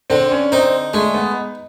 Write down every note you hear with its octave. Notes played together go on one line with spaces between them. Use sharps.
D3 C4
C#4
C4 D#4
G#3 A3
B3